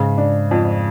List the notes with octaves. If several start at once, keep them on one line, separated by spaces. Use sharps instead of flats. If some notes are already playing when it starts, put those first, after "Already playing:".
Already playing: G#2 C#3
D4
F2